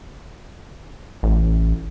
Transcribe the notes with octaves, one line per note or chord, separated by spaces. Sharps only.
A1